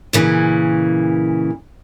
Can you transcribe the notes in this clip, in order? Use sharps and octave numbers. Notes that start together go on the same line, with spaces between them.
A#2 C#3 E3